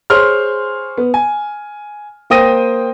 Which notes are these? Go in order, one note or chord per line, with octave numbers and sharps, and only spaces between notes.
G#4 C5 C#5 C6 F6
B3
G#5
A#3 C5 G5 D#6 A#6 D#7